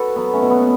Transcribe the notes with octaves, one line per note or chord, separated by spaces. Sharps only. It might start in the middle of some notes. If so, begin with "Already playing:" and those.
Already playing: F#4 A4 B4 C#5
F#3 B3
A3 C#4
B2
B3